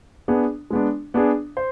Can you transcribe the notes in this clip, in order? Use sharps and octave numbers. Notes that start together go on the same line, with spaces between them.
B3 D4 G#4
G#3 B3 D4
B3 D4 G#4
C5